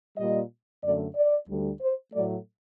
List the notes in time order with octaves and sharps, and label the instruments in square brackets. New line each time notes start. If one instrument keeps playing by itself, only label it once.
[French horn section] A#2 G3 D#5
F#2 D3 A3 D5
D5
D2 D3 G3
C5
A2 F#3 A3 D5